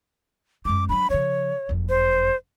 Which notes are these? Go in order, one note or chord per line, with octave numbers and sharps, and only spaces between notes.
F#2 G#3 D6
F#3 D4 B5
C#3 F3 C#5
F#1 F2
C5